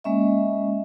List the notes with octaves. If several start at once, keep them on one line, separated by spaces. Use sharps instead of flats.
G#3 A#3 C#4 D#5 E5